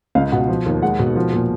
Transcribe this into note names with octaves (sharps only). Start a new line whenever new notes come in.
C#2 F5
B2 F#5
F3
D#2
G#3 F#5
B2
F3
A#2